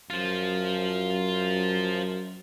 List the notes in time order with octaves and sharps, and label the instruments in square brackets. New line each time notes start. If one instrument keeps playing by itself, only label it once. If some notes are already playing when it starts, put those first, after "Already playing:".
[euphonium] F#2 [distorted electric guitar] F4 C5